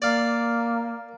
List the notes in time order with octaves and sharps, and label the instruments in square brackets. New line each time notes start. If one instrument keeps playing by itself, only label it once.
[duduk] A#3 [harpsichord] D5 F5